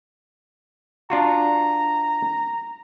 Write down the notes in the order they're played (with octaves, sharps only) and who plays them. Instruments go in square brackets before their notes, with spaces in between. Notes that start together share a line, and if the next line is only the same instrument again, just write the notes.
[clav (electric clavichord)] D4 F4 F#4 [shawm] A#5